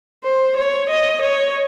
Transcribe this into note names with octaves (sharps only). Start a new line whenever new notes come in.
C5
C#5
D#5
C#5